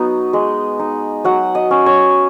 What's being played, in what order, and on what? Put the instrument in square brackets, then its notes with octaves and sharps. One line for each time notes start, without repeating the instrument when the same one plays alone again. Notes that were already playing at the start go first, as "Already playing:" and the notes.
Already playing: [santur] F#3 B3 D#4
G#3 D#5
D#4
F#3 F#5
D#5
C#4
C#5